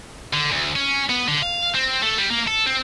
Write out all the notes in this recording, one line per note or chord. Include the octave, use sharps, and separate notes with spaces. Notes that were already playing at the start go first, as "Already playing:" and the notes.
D3
D2
C#4
B3
D3
F5
C4
A3
G3
A#3
A4
C4